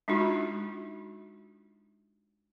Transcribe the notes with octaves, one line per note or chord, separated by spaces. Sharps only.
G#3 D4 D#4 F4 F#4